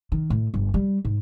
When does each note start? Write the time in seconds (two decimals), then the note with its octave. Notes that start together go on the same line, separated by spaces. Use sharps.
0.12 D#3
0.30 A2
0.54 G1
0.74 G3
1.05 G#2